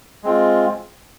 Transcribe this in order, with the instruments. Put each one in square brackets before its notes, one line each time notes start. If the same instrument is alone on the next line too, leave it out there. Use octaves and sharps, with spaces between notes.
[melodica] G#3 C4 F4